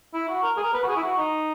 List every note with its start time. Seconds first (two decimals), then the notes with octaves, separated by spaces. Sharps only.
0.14 E4
0.29 F#4
0.43 A#4
0.57 G#4
0.63 A#4
0.74 B4
0.84 F#4
0.89 G#4
0.97 E4
1.03 F#4
1.18 D#4